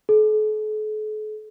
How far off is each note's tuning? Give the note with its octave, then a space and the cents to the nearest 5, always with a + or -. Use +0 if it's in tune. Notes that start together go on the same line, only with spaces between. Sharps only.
A4 -45